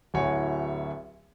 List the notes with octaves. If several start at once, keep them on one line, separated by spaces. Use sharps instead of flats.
D1 A2 F#4 C#5 G#5